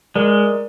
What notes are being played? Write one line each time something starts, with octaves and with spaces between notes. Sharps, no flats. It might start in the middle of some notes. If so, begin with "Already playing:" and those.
G#3 A#4 D5